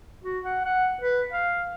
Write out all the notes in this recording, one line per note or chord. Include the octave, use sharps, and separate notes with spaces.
F#4
F#5
F#5
B4
F5